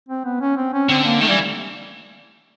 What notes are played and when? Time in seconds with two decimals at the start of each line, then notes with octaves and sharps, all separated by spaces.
0.09 C4
0.25 B3
0.41 C#4
0.57 C4
0.73 C#4
0.89 D3 C4
1.05 A#3
1.21 D#3 A3
1.29 E3 G3